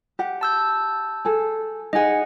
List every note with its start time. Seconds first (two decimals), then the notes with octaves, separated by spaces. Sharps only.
0.19 G4 F#5
0.41 A5 E6 G6
1.25 G#4 A4
1.93 D#4 G#4 D#5 F#5